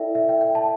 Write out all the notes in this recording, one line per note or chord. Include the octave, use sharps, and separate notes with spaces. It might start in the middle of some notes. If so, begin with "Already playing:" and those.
Already playing: E4 A4 D5 E5 G5
E5
G5
G5
A5